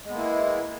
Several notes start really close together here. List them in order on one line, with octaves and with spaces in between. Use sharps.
G#3 B3 A#3 E4